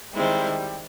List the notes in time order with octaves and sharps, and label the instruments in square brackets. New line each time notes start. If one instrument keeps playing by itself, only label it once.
[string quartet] D#3 G#3 C4 E4 [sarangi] G3